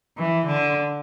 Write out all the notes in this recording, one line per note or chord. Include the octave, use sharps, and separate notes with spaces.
E3
D3